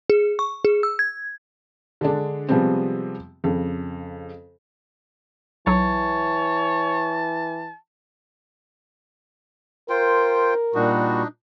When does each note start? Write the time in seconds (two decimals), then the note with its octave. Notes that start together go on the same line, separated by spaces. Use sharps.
0.10 G#4
0.39 C#6
0.65 G#4
0.83 E6
0.99 G#6
2.01 D3 G#3 D4
2.49 C3 F3 G3 G#3 B3 C4
3.44 F2 C#3
5.67 B1 E3 F#3 C#5 A5
9.89 F4 A#4 C5 G5
10.74 A#2 G3 D4 D#4 F#4